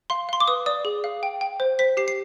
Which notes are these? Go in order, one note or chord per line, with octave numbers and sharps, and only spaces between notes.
F5 C6
F5 C6
D6
B4 D#6
D5 D#6
G#4
F5
G5
G5
C5
C5 B6
G4 C7
C7